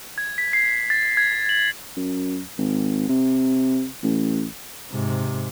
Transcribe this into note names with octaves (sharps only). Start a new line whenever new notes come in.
G#6
B6
C7
A6
G#6
F#7
F#2
G#1
C3
A1
G#2 C3